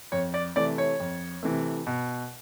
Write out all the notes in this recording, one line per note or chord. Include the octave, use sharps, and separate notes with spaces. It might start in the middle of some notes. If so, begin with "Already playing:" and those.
F2 C#5
D5
C3 E3 A3 D5
C#5
F2
C3 E3 A3
B2